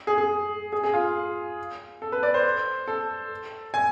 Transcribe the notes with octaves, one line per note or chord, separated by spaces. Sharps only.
G#4
G#4
G#4
G#4
F4
A4
B4
D5
C5
A4
G#5